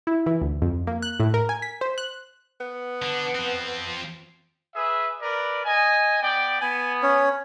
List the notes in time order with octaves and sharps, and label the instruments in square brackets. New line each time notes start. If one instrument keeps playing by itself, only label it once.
[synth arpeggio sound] E4
E3
D2
F2
A#3
F#6
A2
A#4
G#5
B6
C5
F#6
[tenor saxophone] B3
[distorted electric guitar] D3 D4
F3 C4
[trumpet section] G#4 B4 E5
A#4 B4 D5
D#5 G#5
B3 D5 G5
[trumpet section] B3 [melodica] G#5
[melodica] C#4 C#5